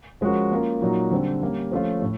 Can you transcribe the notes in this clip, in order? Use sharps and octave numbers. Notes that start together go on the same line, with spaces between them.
F3 G#3 C#4 F#4 A#4
A#3 C#4 F4 A#4
A#2 F#3 A#3 D#4 F#4
D3 G3 C4
G3 A#3 C#4
F3 A3 C#4 F4
A2